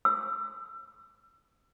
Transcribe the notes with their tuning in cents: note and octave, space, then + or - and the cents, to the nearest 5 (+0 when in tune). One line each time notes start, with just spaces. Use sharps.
E6 +40